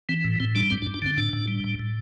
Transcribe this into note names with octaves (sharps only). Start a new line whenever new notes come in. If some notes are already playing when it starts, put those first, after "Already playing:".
E3 C4
A2
A2 C4
G3 D4
G2 C4
D4
G2
D4
D3 C4
A2 D4
A2
G3
A2
A2